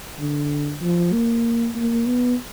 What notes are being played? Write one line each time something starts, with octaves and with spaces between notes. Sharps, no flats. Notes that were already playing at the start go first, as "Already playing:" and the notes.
D3
F3
A#3
A#3
B3